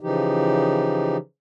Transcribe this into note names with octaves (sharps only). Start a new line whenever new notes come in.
C#3 E3 F3 D#4 G4